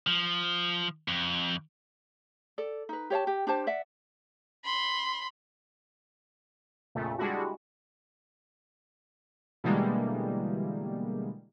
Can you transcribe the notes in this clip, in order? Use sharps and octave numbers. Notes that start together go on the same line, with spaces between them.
F3
F2
A4 D5
D#4 B4
G4 C#5 F5 A5
G4
D4 G4 C5 A5
D5 E5 F#5
B5 C6
A#1 F2 A#2 C#3 A3
G3 G#3 D4 E4 F#4
B2 D3 E3 G3 G#3 A#3